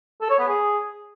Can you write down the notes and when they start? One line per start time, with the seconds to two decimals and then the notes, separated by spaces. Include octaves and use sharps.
0.22 A4
0.30 C#5
0.39 B3
0.47 G#4